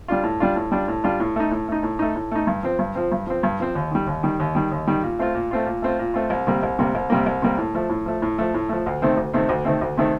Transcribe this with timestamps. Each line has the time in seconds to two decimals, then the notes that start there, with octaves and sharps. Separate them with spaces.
0.08 G3 D4 F4
0.24 A2
0.40 G3 D4 F4
0.56 A2
0.72 G3 D4 F4
0.88 A2
1.04 G3 D4 F4
1.20 A2
1.36 A3 D#4
1.51 A2
1.68 A3 D#4
1.83 A2
1.99 A3 D#4
2.16 A2
2.32 A3 D#4
2.47 G2
2.63 F3 C4
2.79 G2
2.95 F3 C4
3.12 G2
3.27 F3 C4
3.43 G2
3.60 F3 C4
3.75 D#2
3.91 D#3 G3
4.07 D#2
4.23 D#3 G3
4.40 D#2
4.55 D#3 G3
4.71 D#2
4.87 D#3 G3
5.03 A#2
5.19 A3 C4 F4
5.35 A#2
5.51 A3 C4 F4
5.66 A#2
5.82 A3 C4 F4
5.99 A#2
6.14 A3 C4 F4
6.30 C2
6.47 C3 G3 A#3
6.63 C2
6.79 C3 G3 A#3
6.95 C2
7.10 C3 G3 A#3
7.26 C2
7.42 C3 G3 A#3
7.58 A2
7.75 F3 A3
7.90 A2
8.06 F3 A3
8.22 A2
8.38 F3 A3
8.54 A2
8.69 F3 A3
8.86 D2
9.02 C3 D#3 A3 C4
9.17 D2
9.34 C3 D#3 A3 C4
9.49 D2
9.65 C3 D#3 A3 C4
9.81 D2
9.97 C3 D#3 A3 C4